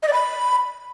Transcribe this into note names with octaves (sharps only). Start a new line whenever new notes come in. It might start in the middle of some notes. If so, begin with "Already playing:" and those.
D#5
D5
B5